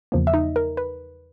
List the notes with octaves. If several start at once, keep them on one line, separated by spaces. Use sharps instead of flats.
E2 C#3 F3 A#3
E5
D#4 D#5
A#4
B4